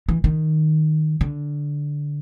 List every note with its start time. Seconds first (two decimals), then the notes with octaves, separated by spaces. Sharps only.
0.09 E3
0.24 D#3
1.21 D3